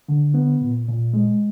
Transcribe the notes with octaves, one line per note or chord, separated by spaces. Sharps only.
D3
B3
A#2
A#2
G#3